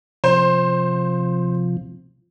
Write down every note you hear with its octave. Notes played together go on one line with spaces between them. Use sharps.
C3 F3 C5